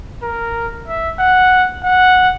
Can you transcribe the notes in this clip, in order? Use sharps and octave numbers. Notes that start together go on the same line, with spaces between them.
A#4
E5
F#5
F#5